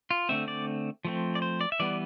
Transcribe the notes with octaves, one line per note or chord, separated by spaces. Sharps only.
F4
D3 A3 C4 E5
D5
F3 A3 C4
D5
C5
D5
E5
E3 G3 B3 D5